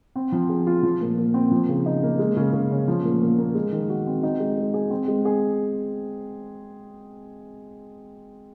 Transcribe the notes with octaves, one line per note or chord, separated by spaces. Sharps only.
C4
F3
G#4
F4
F3
A#2
A#2
C4
F3
C#3
D#4
A#3
G#3
C#3
C#3
C#4
F3
A#2
A#2
A#3
G#3
D#3
F#4
C4
D#4
G#3
G#3
G#4
C4
G#3
G#4